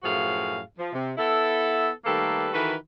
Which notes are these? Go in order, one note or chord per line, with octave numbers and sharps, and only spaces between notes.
F#2 A2 F3 F#4 G#4 F5
F3
C3
B3 E4 A4
D#3 G3 A3 A#3 A4 B4
D#3 E3 F#4 A4 B4